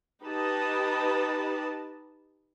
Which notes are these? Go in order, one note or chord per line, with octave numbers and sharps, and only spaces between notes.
D#4 G4 B4 D#5 A5